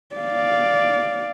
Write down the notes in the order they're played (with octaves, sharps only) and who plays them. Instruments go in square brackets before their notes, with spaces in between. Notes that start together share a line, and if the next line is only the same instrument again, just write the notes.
[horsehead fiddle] D5 F5